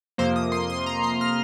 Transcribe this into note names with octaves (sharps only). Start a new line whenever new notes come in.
F2 C3 F3 A#3 C5
D#6
C6
C6
A#5
C6
F6